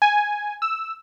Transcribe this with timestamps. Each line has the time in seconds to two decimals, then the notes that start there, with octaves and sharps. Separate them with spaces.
0.02 G#5
0.62 E6